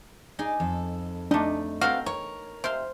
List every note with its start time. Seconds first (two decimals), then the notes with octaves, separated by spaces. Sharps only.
0.39 D#4 G#4 D5
0.60 F2 A4
1.31 A3 D4 D#4
1.81 B3 C4 F#4 A4 D5 F5 G5 A#5
2.06 A#4 C#5
2.64 C3 C5 F5 C6